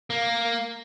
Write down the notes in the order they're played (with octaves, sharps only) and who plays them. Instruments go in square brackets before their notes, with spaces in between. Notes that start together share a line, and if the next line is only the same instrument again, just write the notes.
[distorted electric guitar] A#3